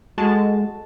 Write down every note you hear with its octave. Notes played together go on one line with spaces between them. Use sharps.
G#3 F#4 A4 A5